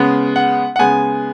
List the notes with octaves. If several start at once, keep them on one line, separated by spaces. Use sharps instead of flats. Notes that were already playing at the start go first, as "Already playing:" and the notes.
Already playing: C#3 G#3 B3
F#5
F#5
C#3 G#3 B3 G#5